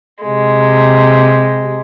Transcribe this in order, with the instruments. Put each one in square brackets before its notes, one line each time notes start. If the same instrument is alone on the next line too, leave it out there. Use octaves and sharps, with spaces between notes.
[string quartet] C3 G#3